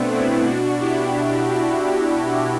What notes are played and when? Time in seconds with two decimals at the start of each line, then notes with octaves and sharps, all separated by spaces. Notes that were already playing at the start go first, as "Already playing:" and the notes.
Already playing: B2 A3 B3 C4 D4
0.12 C4 E4
0.46 B2 D4 F#4
0.80 E4 G4